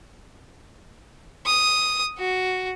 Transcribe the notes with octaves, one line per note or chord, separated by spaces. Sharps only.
D#6
F#4